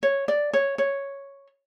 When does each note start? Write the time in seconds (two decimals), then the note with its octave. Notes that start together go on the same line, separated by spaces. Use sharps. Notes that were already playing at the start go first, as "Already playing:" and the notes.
0.03 C#5
0.28 D5
0.53 C#5
0.78 C#5